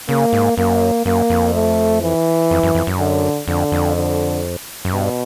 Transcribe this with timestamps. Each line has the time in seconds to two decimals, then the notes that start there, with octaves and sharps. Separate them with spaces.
0.09 C#3 A#3
0.33 G#2
0.58 F#2 A#3
1.06 F#2 A#3
1.30 F2
1.54 A3
2.02 E3
2.51 F2
2.63 F#2
2.75 F2
2.87 F#2
2.99 D3
3.48 F2 D3
3.72 F2
3.96 D3
4.85 F#2
4.93 G2 B2